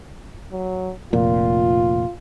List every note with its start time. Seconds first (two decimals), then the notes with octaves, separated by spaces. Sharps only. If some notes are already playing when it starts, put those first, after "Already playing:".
0.51 F#3
1.13 F1 A#2 F4